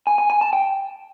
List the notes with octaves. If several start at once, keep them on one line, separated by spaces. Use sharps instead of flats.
G#5
G#5
G#5
A5
G5